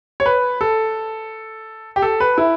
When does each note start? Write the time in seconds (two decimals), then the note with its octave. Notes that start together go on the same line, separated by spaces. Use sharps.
0.20 C#5
0.26 B4
0.61 A4
1.96 G4
2.02 A4
2.20 B4
2.38 E4